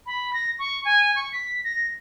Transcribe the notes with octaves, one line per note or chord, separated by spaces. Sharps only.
B5
A#6
C#6
G#5
C#6
B6
A#6